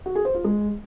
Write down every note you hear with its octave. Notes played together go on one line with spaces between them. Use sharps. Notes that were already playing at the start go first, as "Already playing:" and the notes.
F#4
G#4
C5
F4
G#3